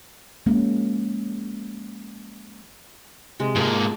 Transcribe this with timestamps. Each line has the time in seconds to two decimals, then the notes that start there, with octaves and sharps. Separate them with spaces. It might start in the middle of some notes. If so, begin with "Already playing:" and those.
0.46 F3 G#3 A#3 C#4
3.40 C3 G#3
3.55 G#2 F3 A#3 C#6